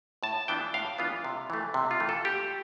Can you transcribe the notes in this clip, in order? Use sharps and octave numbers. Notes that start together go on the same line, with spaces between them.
A2 A5
E3 B3 D4 F4 G5
A2 F5
E3 B3 D4 F4
C3
E3 A3
C3
F4
E3 A3
A4
B2 G4